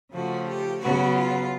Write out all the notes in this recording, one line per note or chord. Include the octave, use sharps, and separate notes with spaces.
C#3 F3 A3 F#4
G4
C#3 F#3 B3 F#4
F4